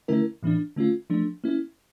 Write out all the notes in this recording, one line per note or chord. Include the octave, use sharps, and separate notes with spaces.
D3 A3 C#4 E4 A#4
A2 E3 A#3 D4
D3 A3 C#4 F4
F3 A3 D4
A#3 C#4 E4